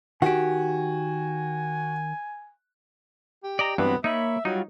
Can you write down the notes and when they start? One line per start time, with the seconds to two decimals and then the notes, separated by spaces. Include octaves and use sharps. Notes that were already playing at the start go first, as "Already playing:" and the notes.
0.22 D#3 F#4 G4 G#5
3.44 G4
3.59 D5 D#5 A#5
3.78 G2 E3 F#3 B3 C4 B4
4.04 A#3 D#4 C#5 E5 B5
4.45 F#3 G3 D#4 F4 F#4